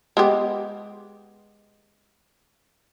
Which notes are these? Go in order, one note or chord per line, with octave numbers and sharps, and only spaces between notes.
G#3 B3 G4